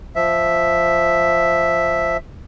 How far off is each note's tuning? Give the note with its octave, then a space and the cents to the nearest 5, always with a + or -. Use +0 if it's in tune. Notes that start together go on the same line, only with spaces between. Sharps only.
F3 +0 E5 +0